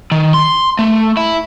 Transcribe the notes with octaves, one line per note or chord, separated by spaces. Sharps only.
D#3
C6
A3
E4